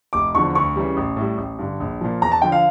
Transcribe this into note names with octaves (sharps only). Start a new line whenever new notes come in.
F1 D6
E2 D3 F3 C#6
D2 C#6
C#3 E3 G3
A1
A2 G3
A1
G2 D3 G3
A#1
A#2 F3
E2 A#5
A5
D3 F3 G5
F5